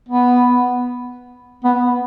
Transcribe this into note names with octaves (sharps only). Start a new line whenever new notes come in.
B3
B3